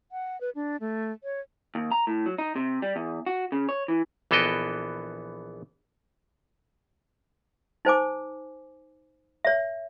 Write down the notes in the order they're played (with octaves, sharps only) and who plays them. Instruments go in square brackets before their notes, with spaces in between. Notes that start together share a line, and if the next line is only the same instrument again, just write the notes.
[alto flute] F#5
B4
D4
A3
C#5
[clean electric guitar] D#2
A#5
A2
F#3
D#4
C3
G3
E2
F#4
C#3
C#5
E3
[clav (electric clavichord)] A#1 E3 B3 A4 D#5 G5
[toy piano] D#4 C5 G#5 D6
C#5 E5